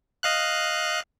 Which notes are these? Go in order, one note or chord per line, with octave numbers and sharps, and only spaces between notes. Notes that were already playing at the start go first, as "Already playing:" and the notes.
D#5 F5 F#6